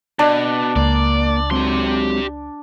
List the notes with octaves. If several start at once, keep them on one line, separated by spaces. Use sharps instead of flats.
B2 D4
C#2 A#3 D5
F#3 G#3 C4 G4 C6